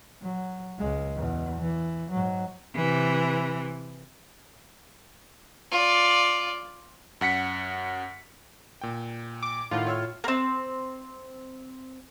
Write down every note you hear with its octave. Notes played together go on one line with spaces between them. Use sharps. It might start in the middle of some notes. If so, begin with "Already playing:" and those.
F#3
C#2 G#3
E2 B2
E3
G#2 F#3
C3 E3
F4 D5
F#2 F#5 B6 C#7
A#2 G5
D6
A2 D#3 F4 F#5
C#5 E6 F6
A#3 C4